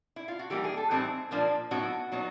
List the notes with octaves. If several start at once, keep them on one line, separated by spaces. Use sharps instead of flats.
E4
F4
F#4
E3 G3 A#3 D#4 G4
G#4
A4
A2 E3 G3 C4 D#4 G#4
A#2 F3 A#3 D4
A2 F#3 B3 D#4 F#4
A#2 F#3 B3 D#4